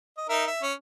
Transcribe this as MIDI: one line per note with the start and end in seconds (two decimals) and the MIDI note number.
0.18 0.25 75
0.29 0.46 63
0.29 0.46 70
0.29 0.46 76
0.47 0.62 76
0.62 0.73 61